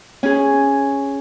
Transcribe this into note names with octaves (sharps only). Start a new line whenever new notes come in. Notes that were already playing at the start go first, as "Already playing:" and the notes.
C#4 G#4